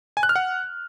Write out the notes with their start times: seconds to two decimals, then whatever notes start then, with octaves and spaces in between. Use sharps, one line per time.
0.17 G#5
0.23 F#6
0.29 F6
0.36 F#5